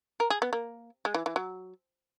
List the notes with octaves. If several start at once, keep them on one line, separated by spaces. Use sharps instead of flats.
A#4
G#4
B3
A#3
G#3
E3
E3
F#3